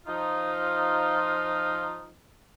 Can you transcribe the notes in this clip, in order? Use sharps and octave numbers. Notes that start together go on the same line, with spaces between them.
F3 D#4 F4